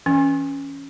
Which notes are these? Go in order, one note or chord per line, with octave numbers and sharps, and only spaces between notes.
E3 C#4